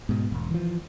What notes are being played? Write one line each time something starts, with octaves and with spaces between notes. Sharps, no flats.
G#2 B2
E1
E3 F3